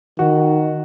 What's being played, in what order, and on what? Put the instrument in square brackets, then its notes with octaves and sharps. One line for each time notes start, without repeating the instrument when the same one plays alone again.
[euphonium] D#3 [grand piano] F#4